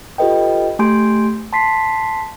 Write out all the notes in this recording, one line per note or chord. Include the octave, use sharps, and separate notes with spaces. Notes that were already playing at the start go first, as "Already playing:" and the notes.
F4 G4 A4 B4 D#5 G5
A3 G4 G#5 C6 G6 D7
A5 C6 B6 C7